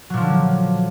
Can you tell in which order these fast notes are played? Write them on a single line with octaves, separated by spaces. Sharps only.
F#3 A#2 F3 D3